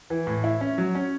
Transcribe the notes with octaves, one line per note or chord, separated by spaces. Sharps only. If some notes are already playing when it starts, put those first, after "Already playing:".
E3
A2
E4
C#4
F#3
C#4